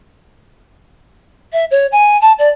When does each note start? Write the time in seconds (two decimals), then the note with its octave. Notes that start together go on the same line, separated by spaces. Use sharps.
1.52 E5
1.71 C#5
1.92 G#5
2.21 A5
2.38 D5